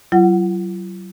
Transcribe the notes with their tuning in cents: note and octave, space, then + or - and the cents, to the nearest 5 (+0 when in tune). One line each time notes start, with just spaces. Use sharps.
F#3 +30 F4 -40 F#5 +0